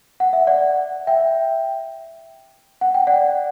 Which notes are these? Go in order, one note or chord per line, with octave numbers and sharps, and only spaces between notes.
F#5
E5
D5 F#5
E5 G5
F#5
G5
D5 F#5